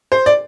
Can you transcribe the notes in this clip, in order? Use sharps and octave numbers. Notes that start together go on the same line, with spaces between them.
C5
D5